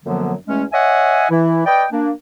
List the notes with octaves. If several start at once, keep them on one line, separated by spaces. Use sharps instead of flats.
F#2 D3 F3 F#3 A#3 B3
E2 G#3 A3 C#4
C#5 D#5 E5 F#5 G#5
E3 E4
B4 D5 D#5 G5
A#3 D4